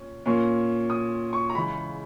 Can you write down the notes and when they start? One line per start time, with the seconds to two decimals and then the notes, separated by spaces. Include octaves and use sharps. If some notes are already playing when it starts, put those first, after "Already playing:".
Already playing: A#2 C#4
0.26 A#2 A#3 C#4
0.90 D#6
1.33 C#6
1.50 A#5
1.54 C#3 E3 G#3 B5